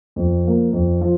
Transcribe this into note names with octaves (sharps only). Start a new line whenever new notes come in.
F2
F3 A#3
F2
F3